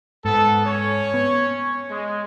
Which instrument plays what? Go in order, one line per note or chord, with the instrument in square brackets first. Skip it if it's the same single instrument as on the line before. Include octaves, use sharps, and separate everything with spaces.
[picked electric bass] G#2 [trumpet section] B3 A4
[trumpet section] C#4 C#5
[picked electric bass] B3
[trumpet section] G#3